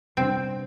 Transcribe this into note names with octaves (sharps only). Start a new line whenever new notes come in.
C3 G3 B3 C4 D4